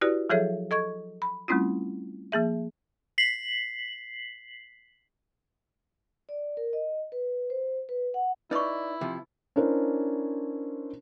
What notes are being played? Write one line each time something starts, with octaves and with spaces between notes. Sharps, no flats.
E4 F#4 G4 B4 D5
F3 F#3 G#4 A4 C#5 E5
A4 D#5 C#6 G#6
B5
G3 A3 C4 C#4 E4 F4
F3 A#3 G#4 E5
B6 C7 F#7
D5
A#4
D#5
B4
C5
B4
F#5
D#4 E4 B4 D5 C#6
C3 F3
C#4 D4 E4 A#4 C5